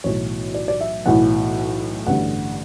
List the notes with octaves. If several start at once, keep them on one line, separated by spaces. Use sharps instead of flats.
B1 A2 E3 C#5
D5
D5
E5
B1 A2 E3 F#5
A1 G2 D3 F#5